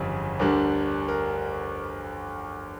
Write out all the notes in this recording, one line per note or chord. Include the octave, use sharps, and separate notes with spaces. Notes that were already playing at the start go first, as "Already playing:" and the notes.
Already playing: G1 F2 C#3 E3 G3
D2 D3 G3 D4 A#4
A#4